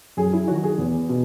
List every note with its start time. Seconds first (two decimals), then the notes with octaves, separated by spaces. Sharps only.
0.17 F#2 G#4
0.33 E4
0.48 D#3 F#3 F#4
0.63 G#4
0.78 E2
1.09 B2